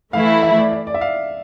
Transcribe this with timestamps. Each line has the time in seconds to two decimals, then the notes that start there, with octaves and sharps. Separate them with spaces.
0.13 E3 A3 E4 F5
0.43 E5
0.57 D5
0.72 D5
0.87 D5
0.94 E5
1.01 F5